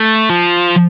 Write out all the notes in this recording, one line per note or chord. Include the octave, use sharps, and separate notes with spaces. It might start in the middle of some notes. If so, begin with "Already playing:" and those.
Already playing: A3
F3